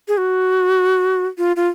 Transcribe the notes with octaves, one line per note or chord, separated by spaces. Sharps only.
G#4
F#4
F4
F4